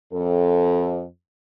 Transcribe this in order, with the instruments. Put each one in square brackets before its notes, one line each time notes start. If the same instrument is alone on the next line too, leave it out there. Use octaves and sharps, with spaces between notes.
[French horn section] F2 A4